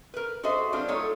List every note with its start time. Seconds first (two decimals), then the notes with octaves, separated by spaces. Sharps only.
0.14 A#4 B4
0.43 F#4 G#4 A4 C5 D#5 E5
0.73 G2 G3 C4 D4 F4
0.88 F#3 A3 D#4 F4 A4 C#5